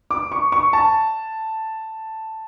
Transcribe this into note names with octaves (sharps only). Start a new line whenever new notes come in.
D6
C#6
C#6
A5